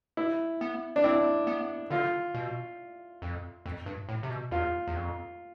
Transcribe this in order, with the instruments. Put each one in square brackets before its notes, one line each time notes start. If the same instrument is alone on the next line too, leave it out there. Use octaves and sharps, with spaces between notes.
[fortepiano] E4
[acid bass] B3
[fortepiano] D4
[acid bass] C4 [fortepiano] E4
[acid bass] B3
[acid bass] D3 [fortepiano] F4
[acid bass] B2
F2
F2
G2
A2
C3
B2
[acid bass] E2 [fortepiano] F4
[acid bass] E2
F2